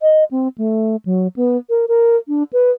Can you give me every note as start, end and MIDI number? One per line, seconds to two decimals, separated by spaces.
0.01 0.24 75
0.31 0.48 60
0.58 0.96 57
1.05 1.28 54
1.36 1.57 59
1.70 1.86 70
1.88 2.17 70
2.28 2.43 62
2.53 2.71 71